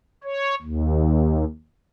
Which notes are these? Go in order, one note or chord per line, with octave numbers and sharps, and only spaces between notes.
C#5
D#2